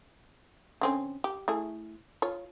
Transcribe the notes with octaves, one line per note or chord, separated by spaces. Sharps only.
D3 C4 C#4
G4
A3 E4 G#4
F4 C#5